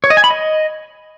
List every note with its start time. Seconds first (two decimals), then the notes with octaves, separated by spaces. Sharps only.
0.04 C#5
0.10 D#5
0.17 G#5
0.24 B5
0.31 D#5